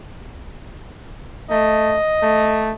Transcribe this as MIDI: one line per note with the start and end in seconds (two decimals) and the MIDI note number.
1.51 1.98 57
1.51 2.76 75
2.23 2.73 57